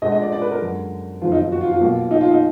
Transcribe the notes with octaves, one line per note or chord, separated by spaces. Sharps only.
D2 D3 G#3 D#5
D#5
D5
D5
B4
A#4
F#2 D3 G#3
F#1 F2 D#3 F#3 B3 F4
D#4
D#4
F#4
F4
F4
B1 B2 F#3 A#3
D#4
F4
D#4